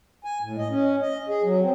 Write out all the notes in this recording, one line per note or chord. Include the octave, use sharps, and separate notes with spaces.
G#5
A2
D#5
C#4
D#5
G#4
F#3
C4